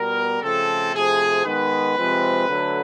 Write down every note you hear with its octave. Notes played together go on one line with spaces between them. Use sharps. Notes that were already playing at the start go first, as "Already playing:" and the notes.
Already playing: B2 G3 B3 A#4
C#3 F3 A3 C4 A4
C3 F3 A3 G#4
D#3 G#3 B3 B4
C3 F3 G#3 C4
D3 F#3 A3